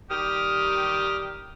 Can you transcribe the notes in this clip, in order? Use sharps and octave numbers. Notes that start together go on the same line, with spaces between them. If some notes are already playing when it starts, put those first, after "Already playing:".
D#3 G3 G4 D#6 F6